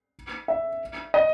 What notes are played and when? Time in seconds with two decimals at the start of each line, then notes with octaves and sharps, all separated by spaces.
0.48 E5
1.14 D#5